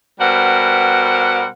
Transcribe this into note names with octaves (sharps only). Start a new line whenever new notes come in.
B2 G3 A#4 C5 F#5